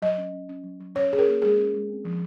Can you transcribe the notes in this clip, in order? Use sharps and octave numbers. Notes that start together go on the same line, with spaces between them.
F#3 D#5
C#4
C#4
C#4
F#3
F#3
C#4 C#5
C#4 G#4
A#4
A#3
G#3 G#4
C#4
G#3
C4
F3